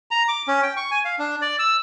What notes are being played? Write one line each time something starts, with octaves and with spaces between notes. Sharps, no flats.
A#5
D6
C#4
G5
C#6
G#5
F5
D4
D5
E6